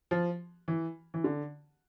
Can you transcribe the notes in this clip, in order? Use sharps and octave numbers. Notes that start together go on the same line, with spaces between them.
F3
E3
E3
D3